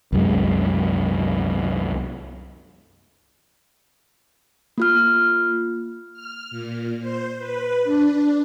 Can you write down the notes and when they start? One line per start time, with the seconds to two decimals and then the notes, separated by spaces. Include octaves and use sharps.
0.12 C2 F#2 G#3
4.78 A#3 F4 F6
6.13 F6
6.51 A#2
7.01 C5
7.38 B4
7.84 D4